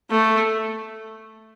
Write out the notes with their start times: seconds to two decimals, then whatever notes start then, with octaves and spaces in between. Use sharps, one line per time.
0.10 A3